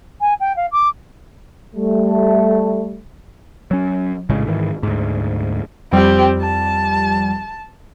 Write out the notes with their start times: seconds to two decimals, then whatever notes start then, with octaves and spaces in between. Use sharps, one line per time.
0.21 G#5
0.40 G5
0.56 F5
0.72 D6
1.75 G3 A3
3.71 F#3 C#4
4.29 A#1 A2 C#3 G#3
4.47 G#2 D#3 E3
4.83 D2 G#2
5.93 F2 G3 C4 G4
6.42 A5